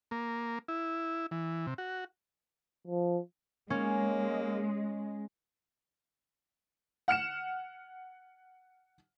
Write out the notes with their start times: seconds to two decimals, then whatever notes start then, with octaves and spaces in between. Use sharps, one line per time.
0.11 A#3
0.68 E4
1.31 E3
1.67 C3
1.78 F#4
2.87 F3
3.70 G#3 A#3 C#4
7.08 F#5 F6 C#7 E7